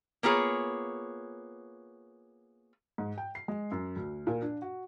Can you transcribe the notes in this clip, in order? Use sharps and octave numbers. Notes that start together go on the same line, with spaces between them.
A#3 B3 F4 G#4 C#5
G#2
G5
C7
G#3
F#2
D2
A#2
D4
F#4